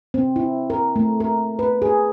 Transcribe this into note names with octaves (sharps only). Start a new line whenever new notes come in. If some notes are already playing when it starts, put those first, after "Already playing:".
C4
E4
A#4
A3
A#4
B4
G#4